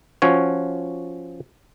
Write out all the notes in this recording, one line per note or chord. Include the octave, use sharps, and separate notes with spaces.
F3 C#4 F#4 C#5